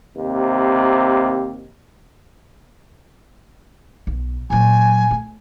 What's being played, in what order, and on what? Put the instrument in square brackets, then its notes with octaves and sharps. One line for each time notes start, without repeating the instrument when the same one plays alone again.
[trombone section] D#2 C3
[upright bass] B1
[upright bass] A#2 F#3 [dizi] G#5
[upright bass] A3